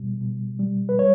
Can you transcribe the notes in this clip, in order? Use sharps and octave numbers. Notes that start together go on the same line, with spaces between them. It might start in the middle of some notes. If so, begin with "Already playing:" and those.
Already playing: B2 G3
B2
G3
B4
G3 C#5